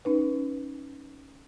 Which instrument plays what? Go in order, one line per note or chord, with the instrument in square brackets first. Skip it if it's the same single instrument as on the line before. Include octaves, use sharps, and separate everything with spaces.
[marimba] C#4 D#4 B4